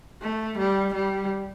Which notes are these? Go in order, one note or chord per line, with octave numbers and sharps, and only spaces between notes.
A3
G3
G3